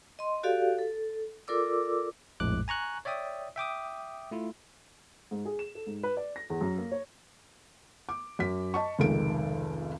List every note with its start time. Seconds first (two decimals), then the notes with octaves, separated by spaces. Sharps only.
0.19 D#5 C6
0.43 F#4 G4 A4 D5 F5
0.79 A4
1.48 F4 A4 A#4 D5 D6 E6
2.40 A#1 F2 A2 G#3 D6 F#6
2.68 G#5 A#5 C#6 F#6
3.05 C#5 D5 E5 G5 D#6
3.56 E5 G5 D6 D#6
4.31 A3 E4 F4
5.31 G#2
5.45 G#4
5.59 E7
5.75 A4
5.86 G#2
6.03 B4
6.17 D5
6.36 A#6
6.50 E2
6.61 F#2
6.78 A#3
6.91 C#5
8.09 D6
8.39 F#2 B6
8.74 D#5 A5 C#6
8.99 F1 C#2 D#3 G#3 A4 D7